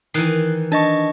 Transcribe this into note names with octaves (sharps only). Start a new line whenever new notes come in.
D#3 E3 F#6 C7
D4 D#5 A5 C#6